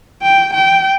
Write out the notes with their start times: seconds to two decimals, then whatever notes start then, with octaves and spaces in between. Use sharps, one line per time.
0.23 G5
0.54 G5